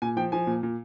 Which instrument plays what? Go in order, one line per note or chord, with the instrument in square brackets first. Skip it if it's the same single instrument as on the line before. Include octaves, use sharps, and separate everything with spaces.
[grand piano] A#2 G#5
F3 G5
F3 G#5
A#2
A#2